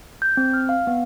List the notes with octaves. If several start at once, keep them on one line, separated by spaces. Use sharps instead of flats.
G6
C4
F6
F5
B3